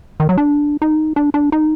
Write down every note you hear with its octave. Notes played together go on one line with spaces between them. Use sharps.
D#3
F#3
D4
D#4
D4
D4
D#4